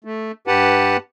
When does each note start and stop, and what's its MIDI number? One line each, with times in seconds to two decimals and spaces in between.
0.04 0.32 57
0.47 0.97 43
0.47 0.97 67
0.47 0.97 71
0.47 0.97 78
0.47 0.97 81